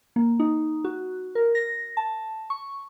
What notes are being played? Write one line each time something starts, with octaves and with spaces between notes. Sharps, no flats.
A#3
D#4
F#4
A#4
A#6
A5
C#6